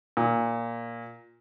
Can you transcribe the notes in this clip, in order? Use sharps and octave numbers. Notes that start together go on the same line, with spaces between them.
A#2